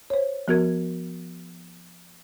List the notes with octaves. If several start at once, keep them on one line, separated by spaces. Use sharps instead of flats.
C5 C#5
F3 B3 F#4 A#4 G#6